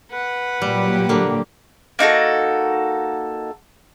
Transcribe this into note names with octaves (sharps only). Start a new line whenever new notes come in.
B4 F#5
A#2 F#3 G3 G4
D3 A#3
A#3 D#4 F#4 A4